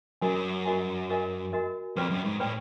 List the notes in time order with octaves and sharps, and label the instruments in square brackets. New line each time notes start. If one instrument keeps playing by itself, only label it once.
[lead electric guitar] F#2 [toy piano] F#4 A#4 D#5 G#5
[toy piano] F#4 A#4 D#5 G#5
F#4 A#4 D#5 G#5
F#4 A#4 D#5 G#5
[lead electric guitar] F2 [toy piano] B4 D5 G5 B5
[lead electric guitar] F#2
G#2
[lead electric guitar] A2 [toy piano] B4 D5 G5 B5